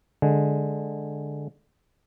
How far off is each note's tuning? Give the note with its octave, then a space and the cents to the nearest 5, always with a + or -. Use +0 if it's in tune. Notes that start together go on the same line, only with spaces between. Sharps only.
D3 +0 G#3 +10